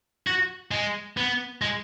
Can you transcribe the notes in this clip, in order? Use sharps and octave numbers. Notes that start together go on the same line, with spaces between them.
F#4
G#3
B3
G#3